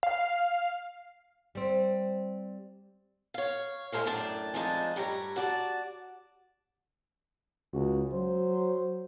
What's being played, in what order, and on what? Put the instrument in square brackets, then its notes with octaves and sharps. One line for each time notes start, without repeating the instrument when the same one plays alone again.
[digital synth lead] F5
[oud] G3 C4
[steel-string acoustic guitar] C#5 F5
G#3 A3 G#4 A#4 C5 F5
F#2 A2 D4 D5
F2 F3 G#3 D4 D#4 A5
G2 G3 C#5 A#5
F#4 D5 A5
[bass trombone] C#2 [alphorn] F#4
[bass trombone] F#3 [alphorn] C5